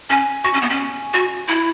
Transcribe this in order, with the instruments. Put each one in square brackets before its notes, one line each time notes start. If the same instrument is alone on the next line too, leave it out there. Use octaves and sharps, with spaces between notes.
[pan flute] C#4 [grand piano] G#5
[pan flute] F#4 [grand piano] C#6
[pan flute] C#4
B3
C#4
F#4
E4